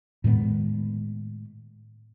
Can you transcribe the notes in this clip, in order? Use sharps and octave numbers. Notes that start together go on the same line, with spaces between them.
A2 D#3 G#3 B3